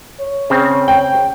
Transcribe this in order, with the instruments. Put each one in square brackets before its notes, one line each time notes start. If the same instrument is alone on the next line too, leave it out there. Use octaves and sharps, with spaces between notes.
[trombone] C#5
[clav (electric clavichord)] C#3 C4
[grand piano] G5